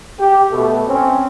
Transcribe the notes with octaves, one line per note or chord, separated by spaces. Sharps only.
G4
B2 A3
C4 C#4